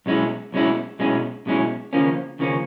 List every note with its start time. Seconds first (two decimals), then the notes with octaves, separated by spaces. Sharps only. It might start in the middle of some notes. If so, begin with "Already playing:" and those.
0.06 B1 B2 G#3 C#4 E4
0.52 B1 B2 G#3 C#4 E4
0.99 B1 B2 G#3 C#4 E4
1.46 B1 B2 G#3 C#4 E4
1.93 D#2 C#3 F3 A#3 C#4
2.39 D#2 C#3 F3 A#3 C#4